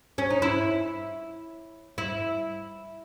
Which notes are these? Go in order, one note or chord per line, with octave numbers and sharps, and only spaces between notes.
C#4
D#4
E4
E4